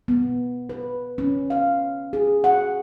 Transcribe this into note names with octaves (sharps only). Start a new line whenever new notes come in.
B3
B4
C#4
F5
G#4
F#5